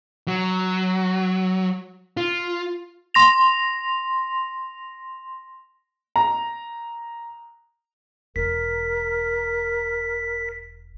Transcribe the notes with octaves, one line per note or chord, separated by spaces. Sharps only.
F#3
F4
C6 A#6 F7
A#5
E1 A#4 B6